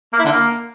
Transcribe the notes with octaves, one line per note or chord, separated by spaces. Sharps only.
A#3
E4
D3
A#3